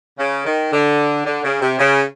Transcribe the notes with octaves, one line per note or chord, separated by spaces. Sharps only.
C#3
D#3
D3
D3
C#3
C3
C#3